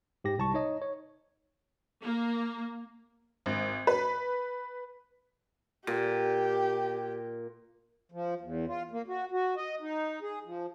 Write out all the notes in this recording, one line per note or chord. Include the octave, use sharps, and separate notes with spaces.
G#2 G4 A#6
C2 A5 C#6
D#4 C#5 D#5
C#5
A#3
G#1
B4
A#2 G4
F3
E2
F4
A#3
F#4
F#4
D#5
D#4
G#4
F3